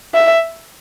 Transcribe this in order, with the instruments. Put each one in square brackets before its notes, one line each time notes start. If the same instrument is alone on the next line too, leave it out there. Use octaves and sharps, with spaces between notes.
[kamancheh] E5